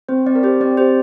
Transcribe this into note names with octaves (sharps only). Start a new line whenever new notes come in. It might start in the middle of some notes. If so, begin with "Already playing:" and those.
C4 C5
C4 D5
A#4
G4 C5
C4 D5
G4 C5